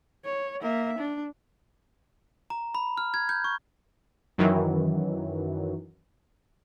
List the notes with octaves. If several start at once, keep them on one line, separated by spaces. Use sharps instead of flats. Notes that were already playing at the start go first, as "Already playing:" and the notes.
C#5
A#3 E5
D4
A#5
B5
F6
G#6
G6
C#6
F#2 D#3 E3 F#3